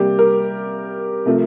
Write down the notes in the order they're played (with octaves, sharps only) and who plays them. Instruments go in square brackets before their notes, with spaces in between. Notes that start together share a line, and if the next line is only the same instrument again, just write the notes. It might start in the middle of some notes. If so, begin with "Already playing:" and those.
Already playing: [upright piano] C3 G3 A#3 G4
A#4
C3 F3 A3